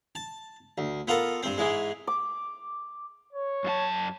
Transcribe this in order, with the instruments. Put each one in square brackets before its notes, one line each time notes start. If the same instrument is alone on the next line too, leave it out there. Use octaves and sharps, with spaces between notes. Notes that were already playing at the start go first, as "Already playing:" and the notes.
[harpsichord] A5
D2
B3 F4 A4 A#4
G2 C4
G#2 E3 G#3
[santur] D6
[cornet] C#5
[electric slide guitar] F#2 F4 A5